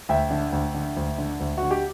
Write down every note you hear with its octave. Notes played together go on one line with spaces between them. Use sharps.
D2 E5 G5
D3
D2
D3
D2
D3
D2
D3 F#4
G4